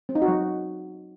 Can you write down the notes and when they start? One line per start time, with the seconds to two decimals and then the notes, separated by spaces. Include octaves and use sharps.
0.09 C4
0.15 D#4
0.22 F#4
0.28 F#3